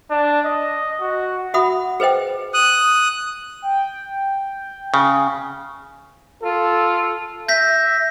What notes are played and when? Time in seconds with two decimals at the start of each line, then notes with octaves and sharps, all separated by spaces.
0.10 D4
0.45 D#5
1.00 F#4
1.54 F#4 E5 F#5 B5 D#6
2.00 G#4 B4 C5 D#5 G5
2.54 D#6 F#6
3.62 G5
4.94 C#3
6.42 F4 A4
7.48 E5 G6 A#6 B6